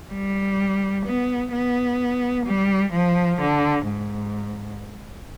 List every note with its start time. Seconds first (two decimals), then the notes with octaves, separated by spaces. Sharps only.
0.12 G3
1.06 B3
1.53 B3
2.46 G3
2.93 F3
3.41 D3
3.87 G#2